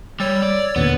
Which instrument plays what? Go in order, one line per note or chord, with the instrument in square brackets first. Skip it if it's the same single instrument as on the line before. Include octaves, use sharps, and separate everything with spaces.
[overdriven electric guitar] G3 [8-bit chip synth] C#5 E6 A6
[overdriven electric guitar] D5
[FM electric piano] D#2 A#2 D3 [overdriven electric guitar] B3